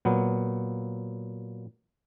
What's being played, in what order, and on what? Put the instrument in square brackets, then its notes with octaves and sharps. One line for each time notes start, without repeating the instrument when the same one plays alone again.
[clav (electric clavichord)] A#2 F#3 B3